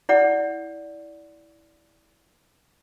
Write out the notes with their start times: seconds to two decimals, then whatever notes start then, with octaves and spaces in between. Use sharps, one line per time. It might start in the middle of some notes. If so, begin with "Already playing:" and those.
0.09 E4 D5 F#5